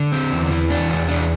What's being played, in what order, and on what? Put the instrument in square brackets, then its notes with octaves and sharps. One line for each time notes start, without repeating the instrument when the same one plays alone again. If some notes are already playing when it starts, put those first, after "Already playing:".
Already playing: [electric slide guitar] D3
C4
E2
E3
D4
E2
D4